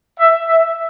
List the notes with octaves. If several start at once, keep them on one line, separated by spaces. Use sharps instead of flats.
E5
E5